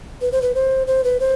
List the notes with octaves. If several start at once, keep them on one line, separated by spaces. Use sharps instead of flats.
B4
C5
B4
C5
C5
B4
C5